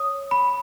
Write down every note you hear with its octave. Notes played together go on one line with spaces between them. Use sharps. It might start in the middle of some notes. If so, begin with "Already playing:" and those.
Already playing: C#5 D#6
B5